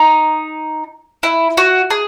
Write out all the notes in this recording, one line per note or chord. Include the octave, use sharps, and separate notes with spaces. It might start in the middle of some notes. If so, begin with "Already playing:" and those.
Already playing: D#4
E4
F#4
G#4